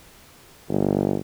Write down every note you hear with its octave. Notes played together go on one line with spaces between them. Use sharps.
G1